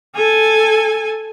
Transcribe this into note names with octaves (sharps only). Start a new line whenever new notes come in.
A4 G#5